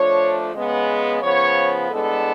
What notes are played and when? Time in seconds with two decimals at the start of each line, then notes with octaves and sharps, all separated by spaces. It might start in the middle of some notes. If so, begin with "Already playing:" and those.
Already playing: F3 A3 D4 C#5
0.54 C#3 G#3 B3
1.22 C#3 F3 B3 C#5
1.89 A2 G#3 B3 D4 A4